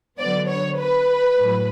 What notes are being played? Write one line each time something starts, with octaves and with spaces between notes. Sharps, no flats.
D3 F#3 B3 D5
C#5
B4
A2 F#3